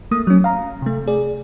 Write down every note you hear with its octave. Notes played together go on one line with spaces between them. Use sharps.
A3 A#3 D#6
F#3 C#4
F5 A#5
C3 A3
G#4 D5